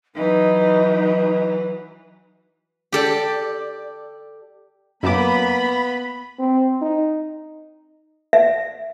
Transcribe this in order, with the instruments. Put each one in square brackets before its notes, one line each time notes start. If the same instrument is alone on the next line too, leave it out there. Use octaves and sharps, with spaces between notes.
[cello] E3 F#3 [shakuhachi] D#4
[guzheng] G4 A4 D5
[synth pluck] F#2 D6 [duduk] A#3 [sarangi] B3 [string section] B5
[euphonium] C4
D#4
[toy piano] E5